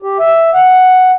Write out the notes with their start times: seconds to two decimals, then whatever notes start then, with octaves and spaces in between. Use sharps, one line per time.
0.02 G4
0.19 E5
0.54 F#5